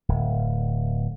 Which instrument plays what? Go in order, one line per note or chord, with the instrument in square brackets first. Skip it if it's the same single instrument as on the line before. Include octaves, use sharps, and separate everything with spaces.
[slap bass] D1